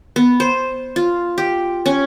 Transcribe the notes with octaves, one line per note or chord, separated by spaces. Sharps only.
B3
C5
F4
G4
C#4